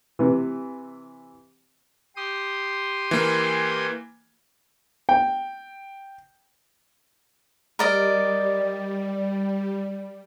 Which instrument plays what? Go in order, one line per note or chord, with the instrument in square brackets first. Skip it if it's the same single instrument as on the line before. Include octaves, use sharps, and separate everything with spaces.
[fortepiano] C3 E3
[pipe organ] G4 C6 D#6
[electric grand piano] E3 A#3
[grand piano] G5
[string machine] G3 [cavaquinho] A#4 D5 D#5